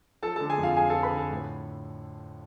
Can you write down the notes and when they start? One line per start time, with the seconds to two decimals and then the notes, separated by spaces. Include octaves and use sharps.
0.22 F3 A4 A5
0.36 D3 A4 A5
0.50 G#4 G#5
0.58 F2
0.63 F4 F5
0.76 F2 G#4 G#5
0.90 F3 A4 A5
1.03 B4 B5
1.12 D3
1.17 A4 A5
1.31 A2